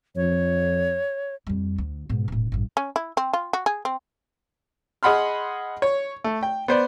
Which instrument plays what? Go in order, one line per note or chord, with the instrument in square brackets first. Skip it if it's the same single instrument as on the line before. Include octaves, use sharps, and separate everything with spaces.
[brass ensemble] F2 [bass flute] C#5
[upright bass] F2 G3
D2
G#2 B2
E1 A2
A1 G2
[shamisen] C#4
E4
C4
F4
F#4
G#4
C4
[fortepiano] G#4 D#5 F#5 B5 C6 F6
C#5
A3
G5
B3 C5 D5